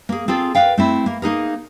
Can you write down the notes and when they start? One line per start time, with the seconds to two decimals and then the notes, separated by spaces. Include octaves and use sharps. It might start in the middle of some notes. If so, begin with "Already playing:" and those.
0.09 A#3 G#4
0.28 C4 F4 G#4 A4
0.55 A#4 B4 D5 F5 G5
0.78 A3 C4 E4
1.06 A#3 A#4
1.22 A#3 D#4 G#4 A#4